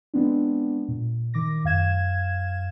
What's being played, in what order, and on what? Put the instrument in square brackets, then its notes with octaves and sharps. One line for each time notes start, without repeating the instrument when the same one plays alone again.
[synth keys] G#3 B3 C4 D4
A#2
D#3 D6 A#6
F#2 F5 G#6 E7